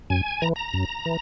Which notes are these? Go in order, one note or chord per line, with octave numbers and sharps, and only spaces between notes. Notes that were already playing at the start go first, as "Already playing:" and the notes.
F#2 G#5
E3 A#5
A#5
F#2
E3